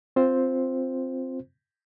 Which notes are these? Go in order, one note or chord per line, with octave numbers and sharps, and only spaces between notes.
C4 F4 C5